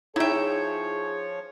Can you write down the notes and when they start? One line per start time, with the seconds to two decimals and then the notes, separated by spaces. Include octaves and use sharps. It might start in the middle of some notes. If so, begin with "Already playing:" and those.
0.16 F3 D#4 E4 G#4 C#5 E5 G5